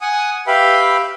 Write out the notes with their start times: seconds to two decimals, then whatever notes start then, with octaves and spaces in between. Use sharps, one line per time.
0.01 F#5 G#5 D#6
0.47 G4 B4 E5 F5 G5 B5